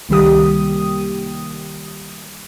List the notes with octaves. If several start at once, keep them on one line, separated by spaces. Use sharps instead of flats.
C2 D#3 G3 A#3 G4 D#6